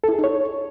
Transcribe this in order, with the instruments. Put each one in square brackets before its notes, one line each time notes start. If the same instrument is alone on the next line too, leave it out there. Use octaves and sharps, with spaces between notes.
[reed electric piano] A4
E4
G#4
D#4
C#5